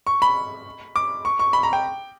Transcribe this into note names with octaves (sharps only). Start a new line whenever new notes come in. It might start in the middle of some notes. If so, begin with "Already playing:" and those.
C#6
B5
D6
C#6
C#6
B5
A#5
G5